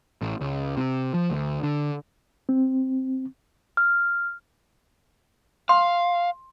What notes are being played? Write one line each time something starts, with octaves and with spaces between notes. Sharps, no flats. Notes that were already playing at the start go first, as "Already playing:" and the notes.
A1
C#2
C3
F3
D2
D3
C4
F6
F5 C6